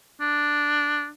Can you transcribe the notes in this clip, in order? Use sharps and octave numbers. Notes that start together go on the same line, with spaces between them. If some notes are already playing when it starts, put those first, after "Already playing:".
D4